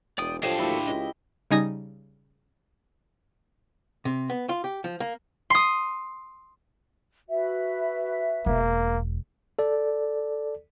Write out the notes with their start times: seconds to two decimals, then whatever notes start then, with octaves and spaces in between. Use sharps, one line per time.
0.18 E1 D5 G5 D#6
0.43 D3 F3 D4 G4 C5 C#5 D#5 F5
0.59 D#2 E4 F#4 A4
0.87 C#2 D#5
1.51 C#3 G3 D#4 G#5 D#6 A#6
4.05 C3
4.30 B3
4.49 F4
4.64 G4
4.84 F3
5.00 A#3
5.50 C6 D#6
7.29 F#4 B4 E5
8.46 E1 A#3
9.59 A4 D5